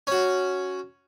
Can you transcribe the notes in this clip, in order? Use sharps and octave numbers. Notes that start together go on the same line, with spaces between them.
C#4 F#4